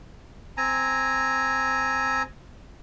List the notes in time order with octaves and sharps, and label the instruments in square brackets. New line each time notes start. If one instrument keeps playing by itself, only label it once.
[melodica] C4 G#5 A#5